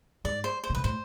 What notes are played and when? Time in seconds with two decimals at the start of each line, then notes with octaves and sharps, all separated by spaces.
0.24 G#2 D5
0.44 C5
0.64 C5
0.70 C3
0.75 B2 B4
0.84 A2 C5